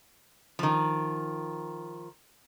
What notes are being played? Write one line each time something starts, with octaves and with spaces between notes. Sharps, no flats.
D#3 F3